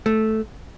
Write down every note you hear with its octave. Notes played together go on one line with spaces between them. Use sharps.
A3